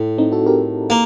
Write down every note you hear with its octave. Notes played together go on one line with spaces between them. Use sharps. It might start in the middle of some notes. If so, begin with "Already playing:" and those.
Already playing: A2
C4 D#4
F#4 A4
G4 A#4
A#3